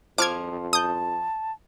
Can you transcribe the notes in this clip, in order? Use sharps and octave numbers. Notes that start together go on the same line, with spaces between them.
F2 F3 D6 F6 G#6
A5 D#6 G6